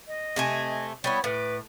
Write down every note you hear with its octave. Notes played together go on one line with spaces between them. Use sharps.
D#5
C3 A3 G#5
G3 B3 E4 C#5 C#6
A2 B4 D6